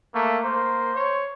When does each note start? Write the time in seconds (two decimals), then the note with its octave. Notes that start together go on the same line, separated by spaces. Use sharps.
0.15 A3 A#3
0.44 A#3 C5
0.95 C#5